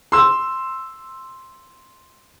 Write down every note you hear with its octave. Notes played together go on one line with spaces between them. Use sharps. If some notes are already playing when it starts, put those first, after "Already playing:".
C6 E6